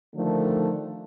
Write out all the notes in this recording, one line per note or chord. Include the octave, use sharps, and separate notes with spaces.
D3 D#3 F3 A3